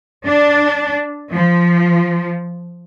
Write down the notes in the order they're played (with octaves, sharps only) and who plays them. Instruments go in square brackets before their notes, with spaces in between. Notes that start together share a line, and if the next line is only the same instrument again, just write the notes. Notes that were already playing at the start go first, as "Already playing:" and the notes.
[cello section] D4
F3